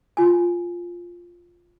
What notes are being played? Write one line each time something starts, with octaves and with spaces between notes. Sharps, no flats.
F4 G#5